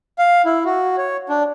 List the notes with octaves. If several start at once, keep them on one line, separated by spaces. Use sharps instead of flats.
F5
E4
F#4
C#5
D4